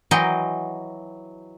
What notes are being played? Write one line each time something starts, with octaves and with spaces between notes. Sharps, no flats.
E3 F#3 D#5 G5 A#5 C6